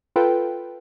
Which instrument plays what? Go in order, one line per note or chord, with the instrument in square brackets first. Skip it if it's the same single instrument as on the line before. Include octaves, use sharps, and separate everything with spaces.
[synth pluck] F4 A4 B4 G5